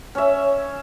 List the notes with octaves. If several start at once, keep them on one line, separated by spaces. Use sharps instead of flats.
C#4 E5